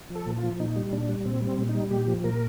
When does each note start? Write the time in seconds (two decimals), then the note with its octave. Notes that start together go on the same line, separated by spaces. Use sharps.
0.10 F3
0.15 A4
0.26 A#2
0.37 F4
0.43 F3
0.59 A#2 D#4
0.76 G3
0.93 A#2 D4
1.09 G3
1.25 A#2 C4
1.42 G3
1.47 C4
1.58 A#2
1.69 D#4
1.75 G3
1.91 A#2 G4
2.08 F3
2.24 A#2 A#4